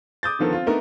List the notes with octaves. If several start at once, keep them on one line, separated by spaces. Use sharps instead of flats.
D6 D#6 G6 A6
D3 D#3 F3 B3 A4 A#4
C4 F4
A3 B3 D4 D#4 A#4